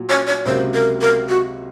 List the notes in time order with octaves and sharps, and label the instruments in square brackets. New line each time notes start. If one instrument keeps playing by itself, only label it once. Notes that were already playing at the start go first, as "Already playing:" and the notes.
Already playing: [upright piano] A#2 F#3
[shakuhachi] C#5
C#5
[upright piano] C#2 C3 F#3 A#3 [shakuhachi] C5
[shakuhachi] A#4
A#4
F#4